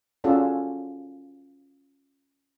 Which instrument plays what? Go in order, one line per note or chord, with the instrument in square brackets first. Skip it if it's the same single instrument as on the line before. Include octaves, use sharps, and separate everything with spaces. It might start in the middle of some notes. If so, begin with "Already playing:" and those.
[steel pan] C#4 F4 F#4 G#4 A4 D5